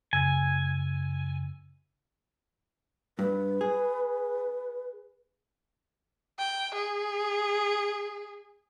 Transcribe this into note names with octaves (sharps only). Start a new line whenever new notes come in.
F#2 C#3 G#5 E6
G2 B4
G#4
G5
G#4